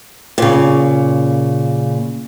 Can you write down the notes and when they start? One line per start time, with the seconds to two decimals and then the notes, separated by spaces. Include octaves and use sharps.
0.38 A#2 C#3